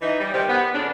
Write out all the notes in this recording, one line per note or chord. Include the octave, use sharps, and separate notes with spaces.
E3 D#4
G3
C3 D#3 C4 G4
B3
F2 C#3 D4